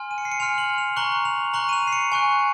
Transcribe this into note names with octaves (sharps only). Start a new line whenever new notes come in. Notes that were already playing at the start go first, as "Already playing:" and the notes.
Already playing: G#5 C6 F6
D#7
C#7
C7
C#7
G#5 C6 F6 F7
F#7
F7
A#5 C#6 F#6 F#7
F7
A#5 C#6 F#6 F#7
D#7
F7
C7
C#7
G#5 C#6 F#6